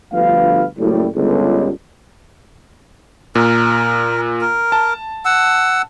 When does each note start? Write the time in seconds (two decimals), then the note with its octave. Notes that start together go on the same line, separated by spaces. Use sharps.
0.13 G1 D2 F3 B4 F5
0.78 F#1 A2 G3
1.16 G1 C#2 D3
3.35 A#2 A#4
4.41 A#4
4.72 A5
5.25 F#5 E6